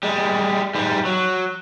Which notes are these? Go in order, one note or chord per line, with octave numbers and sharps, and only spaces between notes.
G3 G#3
G#2 G3
F#3